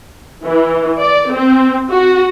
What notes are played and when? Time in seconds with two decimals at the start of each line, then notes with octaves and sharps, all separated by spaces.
0.44 E3
1.01 D5
1.32 C4
1.90 F#4